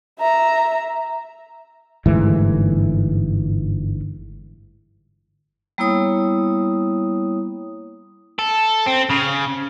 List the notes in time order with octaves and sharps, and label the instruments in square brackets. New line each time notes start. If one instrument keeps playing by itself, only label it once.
[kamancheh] E5 A#5
[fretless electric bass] G1 G#2 E3 A3
[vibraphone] G3 A#3 B3 E4 C#5 D#6
[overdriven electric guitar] A4
C4
C#3